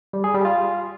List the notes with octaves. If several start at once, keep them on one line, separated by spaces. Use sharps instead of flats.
G3
G#4
G3
F4